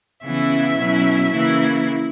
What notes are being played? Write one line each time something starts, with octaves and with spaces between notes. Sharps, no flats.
C#3 E3 B3 E4 E5
B2 F#3 C#4 E4
C#3 E3 A#3 E4